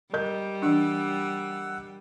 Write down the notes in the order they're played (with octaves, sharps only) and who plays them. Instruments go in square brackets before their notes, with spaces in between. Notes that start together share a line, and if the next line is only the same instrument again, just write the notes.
[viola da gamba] G3 [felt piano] A#4 D#5 G6
[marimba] E3 D4 [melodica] F#5 E6